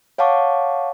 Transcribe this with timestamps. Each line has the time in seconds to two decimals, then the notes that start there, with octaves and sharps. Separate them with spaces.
0.18 C#5 F5 F#5 A5 C#6 D6